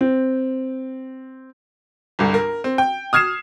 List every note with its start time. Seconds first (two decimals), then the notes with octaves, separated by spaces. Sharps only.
0.01 C4
2.19 G1 C2
2.34 A#4
2.64 C4
2.78 G5
3.13 D#6 F6 G#6 C7 E7